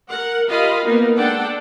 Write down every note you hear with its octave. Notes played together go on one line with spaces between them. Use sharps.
A#4 F#5
F4 G4 A#4 D#5 F5 B5
A#3 B3 D#4 A#4
G#3 D4 A4 D5 F#5 G5